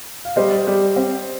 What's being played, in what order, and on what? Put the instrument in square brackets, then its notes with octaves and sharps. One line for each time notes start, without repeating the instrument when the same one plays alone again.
[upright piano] F5
[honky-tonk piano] G3 [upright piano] C5 D#5
[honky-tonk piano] G3
C4